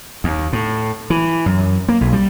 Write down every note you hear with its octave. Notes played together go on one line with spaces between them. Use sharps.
D#2
A2
E3
F#2
A#3
B1
G3